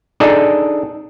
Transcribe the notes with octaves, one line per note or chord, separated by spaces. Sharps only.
D4 D#4 G#4 A4 D5 D#5